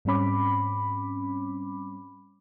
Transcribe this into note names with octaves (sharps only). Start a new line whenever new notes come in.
G#2 G3 C4 C#4 B5 D6